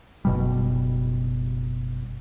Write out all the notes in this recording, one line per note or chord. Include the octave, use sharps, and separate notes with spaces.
F#1 B2 G3